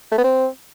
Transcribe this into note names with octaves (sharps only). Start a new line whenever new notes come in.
A3
B3
C4